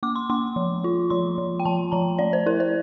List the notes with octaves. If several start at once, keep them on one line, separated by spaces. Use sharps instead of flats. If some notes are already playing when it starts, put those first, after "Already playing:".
A#3 D6
C6
A#3 C6
F3
F4
F3 C6
F3
G5
F3 A5
F3 A#5
A3 D5
C5
E4 A#4
C5